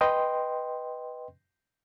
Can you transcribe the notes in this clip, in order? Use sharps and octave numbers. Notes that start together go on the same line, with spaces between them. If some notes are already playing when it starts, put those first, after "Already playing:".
B4 D#5 G5 C6